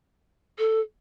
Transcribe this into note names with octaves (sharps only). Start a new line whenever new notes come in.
A4